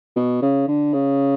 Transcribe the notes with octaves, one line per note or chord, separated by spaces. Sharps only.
B2
C#3
D3
C#3